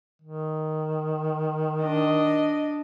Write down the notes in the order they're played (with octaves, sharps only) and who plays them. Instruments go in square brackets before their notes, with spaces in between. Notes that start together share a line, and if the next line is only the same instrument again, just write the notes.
[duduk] D#3
[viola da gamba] D4 D#5